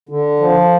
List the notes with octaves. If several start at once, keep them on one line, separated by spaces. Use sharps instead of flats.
D3
F3